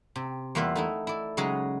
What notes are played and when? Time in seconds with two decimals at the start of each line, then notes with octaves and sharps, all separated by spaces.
0.16 C3
0.55 E2 G3 A#3 F4 E5 F#5
0.75 A3 D#4 E4
1.07 E4 D5
1.37 C#3 F#3 G#3 D#4 D#5